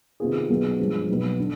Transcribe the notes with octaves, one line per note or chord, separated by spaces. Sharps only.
C3 D#3 B3 F4 G#4
B1 B2 B3 F4 G#4
G2 F3 G#3
B1 B2 B3
D3